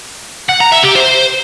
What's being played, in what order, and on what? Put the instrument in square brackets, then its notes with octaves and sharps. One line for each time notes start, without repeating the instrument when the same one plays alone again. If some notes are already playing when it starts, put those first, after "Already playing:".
[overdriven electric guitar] F#5
A#5
E5
G4
C5